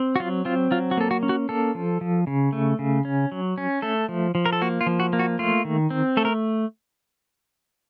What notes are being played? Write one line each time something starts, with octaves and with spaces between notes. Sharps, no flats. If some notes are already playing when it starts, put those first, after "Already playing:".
Already playing: C4
F#4
F#3 F4
C4 F4
F#3 F4
F#4
A#3 A4
F#4
C#4
F#4
A#3 A4
F3
F3
C#3
A3
C#3
C#4
F#3
C#4
A3 A4
F3
F3
A#4
A4
A#3 F#4
F4
F3
F#4
A#3
F#4
A3 F4
D#3
C4
A3 A4
A#4